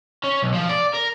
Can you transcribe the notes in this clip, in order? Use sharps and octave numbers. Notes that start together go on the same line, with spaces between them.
C#4
B1
F3
D5
A#4